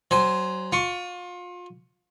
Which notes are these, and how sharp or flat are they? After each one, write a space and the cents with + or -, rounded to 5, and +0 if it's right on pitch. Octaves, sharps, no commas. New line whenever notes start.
F#3 +30 C5 +0 G#5 +10
F4 +30 C#6 +10